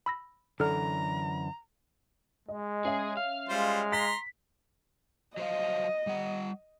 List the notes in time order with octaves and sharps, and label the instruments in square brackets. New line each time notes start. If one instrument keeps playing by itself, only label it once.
[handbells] B5 E6 A#6
[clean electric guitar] F#2 D3 E3 [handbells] A4 D5 F6 [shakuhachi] A#5
[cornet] G#3 [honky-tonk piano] D#5
[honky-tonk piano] C#4 E5 [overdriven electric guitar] G#4
[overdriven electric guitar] F5
[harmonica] G3 F4 C5 [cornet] G#3
[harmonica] A#5 C6 [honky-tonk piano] B6
[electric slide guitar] F#3 C5 F5 [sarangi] D#5
[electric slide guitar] G3 F#5